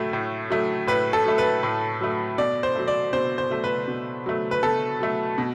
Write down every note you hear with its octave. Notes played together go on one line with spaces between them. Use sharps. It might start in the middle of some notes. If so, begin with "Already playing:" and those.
Already playing: A2 F#3 A3
A2
F#3 A3
A2 B4
A4
F#3 A3
B4
A2
F#3 A3
B2 D5
C5
F#3 A3
D5
B2 C5
C5
F#3 A3
B4
B2
F#3 A3
B4
B2 A4
F#3 A3
B2